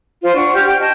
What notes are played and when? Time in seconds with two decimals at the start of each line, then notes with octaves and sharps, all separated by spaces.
0.23 F4 C5
0.35 D4 F#5 C#6
0.55 G4 F6 G6
0.67 G5
0.80 D#5 A5 G6